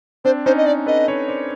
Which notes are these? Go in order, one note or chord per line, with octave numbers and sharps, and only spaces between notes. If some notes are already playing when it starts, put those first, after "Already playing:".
C4 D4 C5
C#4 D#4 C5
D#5
D5
A4 B4 D#5
B4 C#5
C5 D5